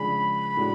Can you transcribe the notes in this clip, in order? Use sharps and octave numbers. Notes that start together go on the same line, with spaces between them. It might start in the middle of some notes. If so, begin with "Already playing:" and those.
Already playing: C#3 F3 G#3 D4 G#4 B5
A2 G#3 D4 F#4